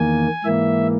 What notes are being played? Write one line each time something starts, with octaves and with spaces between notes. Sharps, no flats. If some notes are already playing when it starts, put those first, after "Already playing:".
Already playing: E2 D#3 A#3 G#5
G#2 E3 A#3 E5